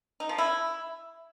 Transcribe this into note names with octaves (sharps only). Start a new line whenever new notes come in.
D#4
F3
E4